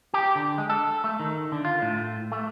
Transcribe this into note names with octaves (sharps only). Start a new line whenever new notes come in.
G4
D3
G#3
A4
A3
D#3
D3
F4
A2
A3